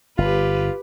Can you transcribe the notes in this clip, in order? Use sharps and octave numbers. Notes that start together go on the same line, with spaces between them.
G1 F4 G4 B4